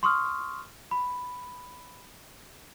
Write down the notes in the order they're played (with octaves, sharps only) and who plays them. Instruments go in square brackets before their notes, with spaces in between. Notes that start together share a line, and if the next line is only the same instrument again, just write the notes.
[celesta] C6 C#6 D#6 F6
B5